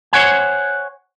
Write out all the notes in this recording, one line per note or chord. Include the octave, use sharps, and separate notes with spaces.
C5 C#5 F#5 G#5